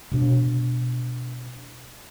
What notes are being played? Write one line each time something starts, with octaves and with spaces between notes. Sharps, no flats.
B2 D4